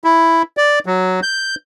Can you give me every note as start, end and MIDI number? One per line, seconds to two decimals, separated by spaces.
0.04 0.42 64
0.57 0.79 74
0.86 1.20 54
1.23 1.55 91